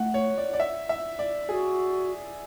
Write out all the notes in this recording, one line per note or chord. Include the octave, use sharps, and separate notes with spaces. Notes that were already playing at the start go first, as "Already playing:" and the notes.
Already playing: A3 F#5
C#5
D5
D5
E5
E5
D5
F#4 G#4